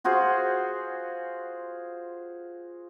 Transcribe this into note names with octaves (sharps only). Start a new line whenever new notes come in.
F4 F#4 G#4 C5